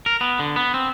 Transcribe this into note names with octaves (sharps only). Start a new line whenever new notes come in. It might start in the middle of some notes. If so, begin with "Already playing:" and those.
A#4
B3
D3
B3
C4